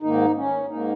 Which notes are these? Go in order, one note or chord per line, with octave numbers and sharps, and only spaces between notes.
G#2 D#3 A#3 D#4
C#4
G#2 D#3 A#3 D#4